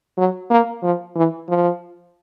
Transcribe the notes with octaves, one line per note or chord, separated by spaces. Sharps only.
F#3
A#3
F3
E3
F3